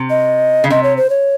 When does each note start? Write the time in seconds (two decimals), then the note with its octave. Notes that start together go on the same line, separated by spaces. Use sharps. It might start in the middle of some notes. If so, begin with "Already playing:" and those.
Already playing: C3
0.10 D#5
0.64 C#3
0.70 C3 D#5
0.83 C#5
0.97 C5
1.10 C#5